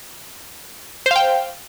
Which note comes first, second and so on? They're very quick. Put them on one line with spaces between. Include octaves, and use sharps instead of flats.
C5 F5 G5